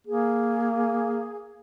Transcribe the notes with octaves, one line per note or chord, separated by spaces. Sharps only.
A#3 G#4